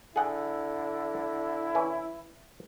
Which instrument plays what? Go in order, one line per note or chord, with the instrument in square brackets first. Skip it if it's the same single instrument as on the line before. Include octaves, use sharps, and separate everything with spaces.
[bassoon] D3 [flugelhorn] E4 [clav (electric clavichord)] G#4 F#5 G5
[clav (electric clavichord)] E3 C#4 B4